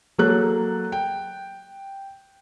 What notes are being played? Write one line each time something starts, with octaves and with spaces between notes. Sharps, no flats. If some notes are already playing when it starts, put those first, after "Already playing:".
F#3 A#3 A4 F#6
G5